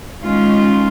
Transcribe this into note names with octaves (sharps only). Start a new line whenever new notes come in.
D#3 G#3 C#4 F4